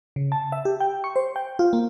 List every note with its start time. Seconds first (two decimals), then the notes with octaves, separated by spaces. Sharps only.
0.16 C#3
0.32 A5
0.52 E5
0.65 G4
0.80 G5
1.04 C#6
1.16 C5
1.36 G5
1.59 F4
1.73 A#3